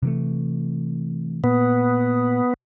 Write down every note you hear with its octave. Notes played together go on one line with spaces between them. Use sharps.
C3 E3 A3
A#2 B3